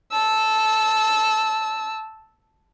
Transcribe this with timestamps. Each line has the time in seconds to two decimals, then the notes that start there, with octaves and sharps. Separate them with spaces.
0.12 A5 E6